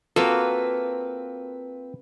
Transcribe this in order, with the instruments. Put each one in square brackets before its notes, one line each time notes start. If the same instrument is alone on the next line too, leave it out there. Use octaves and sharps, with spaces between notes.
[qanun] A#3 F#4 [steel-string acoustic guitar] C4 B4 [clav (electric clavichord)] F4 A4